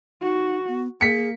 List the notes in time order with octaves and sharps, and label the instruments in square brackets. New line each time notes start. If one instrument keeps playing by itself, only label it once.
[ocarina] D#4 [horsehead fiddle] F#4
[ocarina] B3
[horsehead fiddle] A#3 [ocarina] G#4 [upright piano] B6 C#7